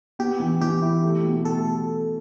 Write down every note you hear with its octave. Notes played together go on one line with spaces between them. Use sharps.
B3 G4
E3
E3 G4
E4
A3
B2
A3 A4